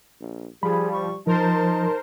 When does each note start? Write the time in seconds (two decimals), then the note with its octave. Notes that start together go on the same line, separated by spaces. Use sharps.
0.20 A#1
0.63 F3 G3 G#4 B5
0.93 C#6
1.27 F3 D#4 A#4 C5 A5